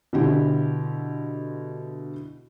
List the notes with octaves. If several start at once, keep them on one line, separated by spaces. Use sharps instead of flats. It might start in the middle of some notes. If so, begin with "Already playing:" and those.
B2 D3 E4 G4